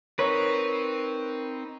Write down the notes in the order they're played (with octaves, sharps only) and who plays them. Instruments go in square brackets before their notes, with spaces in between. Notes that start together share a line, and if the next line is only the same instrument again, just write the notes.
[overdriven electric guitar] C4 [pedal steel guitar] D#4 B4 [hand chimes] A#4 C#6 [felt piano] C#5